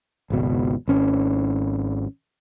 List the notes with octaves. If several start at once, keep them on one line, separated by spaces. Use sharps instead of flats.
G#1 C#2 B2
G#1 C#4